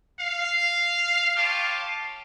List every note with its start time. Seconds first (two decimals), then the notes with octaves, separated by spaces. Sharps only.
0.20 F5
1.37 F4 G4 C#5 F5 A5